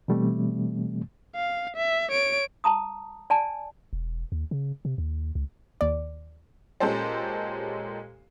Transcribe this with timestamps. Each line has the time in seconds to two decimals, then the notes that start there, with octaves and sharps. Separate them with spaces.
0.08 B2 E3 G3 A3 C4
1.36 F5
1.76 E5
2.11 C#5 D7
2.64 A5 A#5 D#6
3.30 D5 G#5 A5
3.93 E1
4.32 D#2
4.51 C#3
4.85 C3
4.98 D#2
5.35 C#2
5.81 D#2 D5
6.80 A#2 G#3 C#4 G4 A4 C5